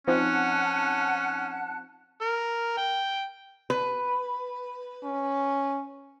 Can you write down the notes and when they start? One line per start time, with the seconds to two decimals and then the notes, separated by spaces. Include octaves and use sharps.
0.08 F3 C4 C#4 D#4 F#5 A5 F#6
2.21 A#4
2.77 G5
3.70 B4
5.04 C#4